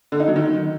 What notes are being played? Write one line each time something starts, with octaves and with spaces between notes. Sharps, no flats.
D3
D#4
F#3
D#3